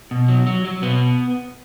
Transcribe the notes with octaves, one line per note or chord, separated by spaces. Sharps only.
B2
F#3
F#3
F#3
B2 B3